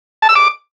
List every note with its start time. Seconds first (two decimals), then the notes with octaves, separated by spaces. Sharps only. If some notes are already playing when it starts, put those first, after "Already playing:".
0.22 A5
0.29 E6
0.35 D6